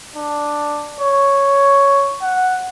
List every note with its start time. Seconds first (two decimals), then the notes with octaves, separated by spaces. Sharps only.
0.16 D4
1.00 C#5
2.22 F#5